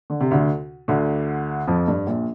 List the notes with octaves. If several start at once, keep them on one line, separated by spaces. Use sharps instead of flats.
D3
C3
D2 D3
D2 D3
F2 F3
G2
A#1 A#2